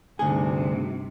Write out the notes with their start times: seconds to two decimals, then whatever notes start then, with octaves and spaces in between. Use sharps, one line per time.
0.19 D2 G2 C3 A3 D#4 F#4 G#4